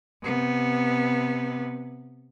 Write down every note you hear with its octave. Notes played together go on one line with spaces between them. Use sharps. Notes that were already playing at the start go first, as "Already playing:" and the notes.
C3 B3